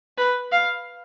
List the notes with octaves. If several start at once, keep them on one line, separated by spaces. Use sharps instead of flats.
B4
F5